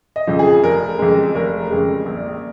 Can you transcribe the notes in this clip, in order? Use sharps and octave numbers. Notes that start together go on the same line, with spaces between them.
D#5
F2 C#3 F3
G#4
F1 A#4
F2 C#3 G#3
F1 A#4
F2 C#3 G#3
A#1